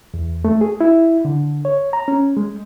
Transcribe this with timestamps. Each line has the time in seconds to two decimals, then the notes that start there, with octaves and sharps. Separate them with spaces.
0.14 E2
0.45 A3
0.61 G#4
0.81 E4
1.25 D3
1.65 C#5
1.93 A#5
2.08 C#4
2.37 G#3